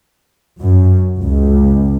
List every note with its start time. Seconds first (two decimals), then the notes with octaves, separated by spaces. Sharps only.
0.60 F#2
1.20 C#2